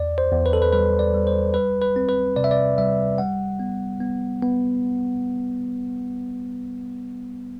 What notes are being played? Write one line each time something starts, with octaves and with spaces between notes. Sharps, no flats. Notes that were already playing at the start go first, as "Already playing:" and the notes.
Already playing: E2 D5
C5
E2
B4
A4
B4
G3 B4
D5
G3
C5
G3 B4
B4
C4
B4
C3 D5
E5
D5
G3 E5
G3 F#5
B3
B3
B3